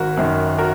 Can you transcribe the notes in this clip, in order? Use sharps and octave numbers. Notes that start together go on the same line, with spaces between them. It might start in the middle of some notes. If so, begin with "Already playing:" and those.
Already playing: G#1 F#4 A#4
F#2 D#3
F#4 A#4